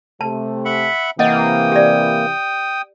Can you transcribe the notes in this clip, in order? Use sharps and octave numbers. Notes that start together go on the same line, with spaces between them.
C3 A3 A5
E5 F#5 B5
C3 E3 A#3 D#5 F#5 G5 D#6
G4 D5